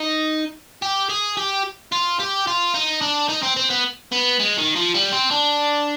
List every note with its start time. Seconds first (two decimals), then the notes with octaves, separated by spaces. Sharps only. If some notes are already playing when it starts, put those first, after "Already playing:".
Already playing: D#4
0.82 G4
1.10 G#4
1.37 G4
1.92 F4
2.20 G4
2.47 F4
2.74 D#4
3.01 D4
3.29 D#4
3.43 C4
3.57 C4
3.70 B3
4.12 B3
4.39 G#3
4.58 D#3
4.76 F3
4.94 G3
5.12 C4
5.31 D4